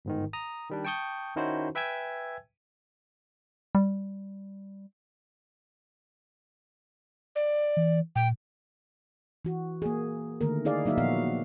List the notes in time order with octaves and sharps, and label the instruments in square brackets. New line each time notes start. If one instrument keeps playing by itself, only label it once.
[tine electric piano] G1 G#2 D#3
A#5 D#6
D#3 G3 D4
G5 A5 C#6 D#6 G6
D#3 C#4 D#4 E4 F#4 C5
B4 E5 G5 G#5 E6 G#6
[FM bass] G3
[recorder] D5
[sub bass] E3
[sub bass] A#2 [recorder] G5
[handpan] E3 F#4
A#3 G#4
D3 D#3 A3 A#3 A#4
D#4 E4 G#4 D5 F5
F#3 A#3 D#4 E5 F5
A#2 F3 B3 F#4 F5